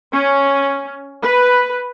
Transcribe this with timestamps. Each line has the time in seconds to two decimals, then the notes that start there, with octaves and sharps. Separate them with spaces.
0.12 C#4
1.23 B4